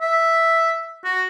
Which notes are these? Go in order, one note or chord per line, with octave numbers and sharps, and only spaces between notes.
E5
F#4